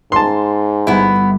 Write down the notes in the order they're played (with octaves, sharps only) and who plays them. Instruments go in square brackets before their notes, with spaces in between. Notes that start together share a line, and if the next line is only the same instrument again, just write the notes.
[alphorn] G#2 [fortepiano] A5 C6
[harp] G1 G3 [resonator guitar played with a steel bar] B3 E4